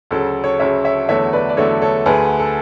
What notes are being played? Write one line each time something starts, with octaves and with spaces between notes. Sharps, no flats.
D2 C#3 F#3 A4
A4 C#5
D2 C#3 F#3 C#5 E5
C#5 E5
E2 D3 F#3 A3 C#5 E5
B4 D5
D5
E2 D3 F#3 A3 A4 C#5
A4 C#5
D2 D3 A3 G#4 B4
A4